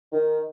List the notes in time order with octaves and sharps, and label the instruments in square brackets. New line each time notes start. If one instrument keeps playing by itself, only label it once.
[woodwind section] D#3